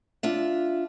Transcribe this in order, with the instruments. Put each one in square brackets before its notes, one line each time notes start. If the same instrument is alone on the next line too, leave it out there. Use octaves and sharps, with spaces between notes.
[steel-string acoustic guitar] D4 F4 E5